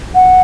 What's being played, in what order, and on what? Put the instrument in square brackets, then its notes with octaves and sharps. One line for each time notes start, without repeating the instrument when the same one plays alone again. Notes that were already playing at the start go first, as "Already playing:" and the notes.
[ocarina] F#5